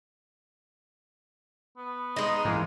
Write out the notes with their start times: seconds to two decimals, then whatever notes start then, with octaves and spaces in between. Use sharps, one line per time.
1.77 B3
2.16 G#3 D#4
2.45 G#2 E3 A#3